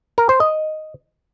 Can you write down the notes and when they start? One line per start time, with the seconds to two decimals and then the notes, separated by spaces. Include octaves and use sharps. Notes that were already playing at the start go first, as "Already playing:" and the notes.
0.18 A#4
0.29 C5
0.40 D#5